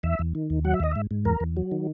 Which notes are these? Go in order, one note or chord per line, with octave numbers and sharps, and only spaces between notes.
E2 E5
E2
D#3
D#2
F#3 F#5
E5
D#2 D#5
G#2 E5
G#2
E2 A#4
E2
F#3
D#3